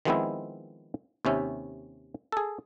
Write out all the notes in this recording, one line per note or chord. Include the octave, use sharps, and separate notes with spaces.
D#3 F3 G#3 B3 C4 E4
D#2 C3 C#4 E5
G#4 A4